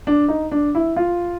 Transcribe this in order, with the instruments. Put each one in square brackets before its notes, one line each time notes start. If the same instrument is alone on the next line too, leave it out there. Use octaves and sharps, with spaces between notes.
[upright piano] D4
D#4
D4
E4
F4